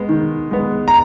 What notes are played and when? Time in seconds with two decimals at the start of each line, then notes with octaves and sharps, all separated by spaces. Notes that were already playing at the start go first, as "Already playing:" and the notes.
Already playing: G#3 B3
0.09 D#3
0.51 G#3 B3
0.88 A#5